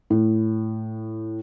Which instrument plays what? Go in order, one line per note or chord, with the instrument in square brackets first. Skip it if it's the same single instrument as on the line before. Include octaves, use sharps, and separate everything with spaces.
[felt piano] A2